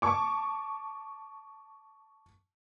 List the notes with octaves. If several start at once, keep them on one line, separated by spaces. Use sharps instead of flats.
A5 C#6 D6